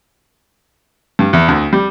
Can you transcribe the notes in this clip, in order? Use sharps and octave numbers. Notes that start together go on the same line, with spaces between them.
G2
E2
D2
G3